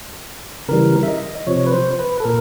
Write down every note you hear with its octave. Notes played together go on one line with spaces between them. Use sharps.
C#3 E3 G3 A#4
E5
D#5
C3 F3 C#5
B4
C5
B4
A4
A#2 A#4